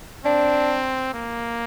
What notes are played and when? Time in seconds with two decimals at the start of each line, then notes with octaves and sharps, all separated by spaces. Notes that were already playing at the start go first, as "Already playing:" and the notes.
0.25 C4 D4
1.13 A#3